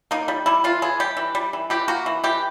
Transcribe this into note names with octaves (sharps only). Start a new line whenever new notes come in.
A#3 D#4
G3
G3 E4
E3 F4
E3 G#4
G3 G4
E3
G3
E3
E3 G4
A#3 F#4
E3
E3 G4